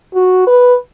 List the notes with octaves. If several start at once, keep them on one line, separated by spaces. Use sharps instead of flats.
F#4
B4